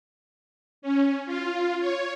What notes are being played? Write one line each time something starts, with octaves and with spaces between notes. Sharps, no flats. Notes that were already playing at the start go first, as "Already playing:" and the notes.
C#4
F4
C#5